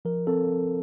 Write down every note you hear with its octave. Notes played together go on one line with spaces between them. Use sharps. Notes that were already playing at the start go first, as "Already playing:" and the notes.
F3 A#4
C4 A4